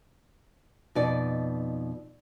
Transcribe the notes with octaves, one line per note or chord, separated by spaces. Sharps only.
F2 B2 D#4 D5